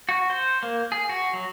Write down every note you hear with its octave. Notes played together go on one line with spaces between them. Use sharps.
F#4
C5
A#3
G#4
F#4
F#3